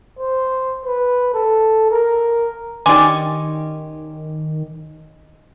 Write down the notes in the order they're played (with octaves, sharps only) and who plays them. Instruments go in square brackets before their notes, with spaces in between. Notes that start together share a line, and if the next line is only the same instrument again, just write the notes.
[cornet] C5
B4
A4
A#4
[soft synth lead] D#3 [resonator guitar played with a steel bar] C#4 D#4 G4 [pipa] D5 G#5 [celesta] C6 D6